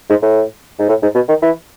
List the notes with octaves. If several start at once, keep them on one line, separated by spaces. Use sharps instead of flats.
G#2
A2
G#2
A2
G#2
B2
D#3
E3